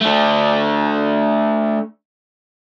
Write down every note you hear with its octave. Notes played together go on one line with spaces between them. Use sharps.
A3 D4